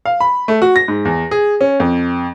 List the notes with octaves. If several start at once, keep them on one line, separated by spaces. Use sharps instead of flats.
F5
B5
A3
F#4
A#6
G#2
E2
G#4
C#4
F2